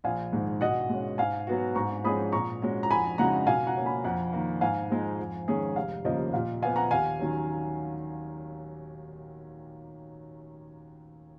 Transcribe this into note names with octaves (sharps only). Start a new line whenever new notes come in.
A#1 F5 G#5
G#2 D#3 G#3
B2 D#5 F#5
G#3 C#4
G#2 F5 G#5
F#3 B3 F#4
G#2 A#5 C#6
F3 G#3 C#4 G#4 B5 D#6
A#2 A#5 C#6
G#3 C#4 F#4
A#5
F2 G#5 B5
C#3 G#3 D#4 F#4 F#5 A#5
B2 F5 G#5
F#5 A#5
A#3 C#4
G#5 B5
F2 F#5 A#5
D#3 A#3
G#2 F5 G#5
F3 G#3 D#4
F2
D#3 G#3 C#4 G#4
F1 F5
D#2 C#3 F3 A#3 D#5
A#2 F5
F3 B3 F4 F5 G#5
F#5 A#5
D#2 F5 G#5
D#3 F#3 C#4